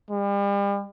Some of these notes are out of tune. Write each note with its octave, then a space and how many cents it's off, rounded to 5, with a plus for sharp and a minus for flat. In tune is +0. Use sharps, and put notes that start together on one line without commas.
G3 +40